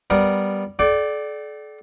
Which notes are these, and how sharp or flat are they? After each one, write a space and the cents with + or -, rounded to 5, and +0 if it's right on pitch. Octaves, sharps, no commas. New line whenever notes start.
G3 +0 B3 +0 A#4 +0
A4 -40 D5 +0 G5 -40